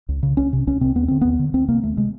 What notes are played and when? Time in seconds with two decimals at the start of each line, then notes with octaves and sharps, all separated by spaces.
0.09 C#2
0.23 C#3
0.37 C2 C#4
0.53 C3
0.67 C2 C#4
0.81 C3 C4
0.95 D#2 B3
1.08 D3 C4
1.21 D#2 B3
1.39 D3
1.54 D2 C4
1.68 C3 A#3
1.82 D2 A3
1.97 C3 G#3